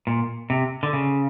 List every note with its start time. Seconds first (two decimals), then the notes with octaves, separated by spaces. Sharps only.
0.07 A#2
0.50 C3
0.83 D3
0.93 C#3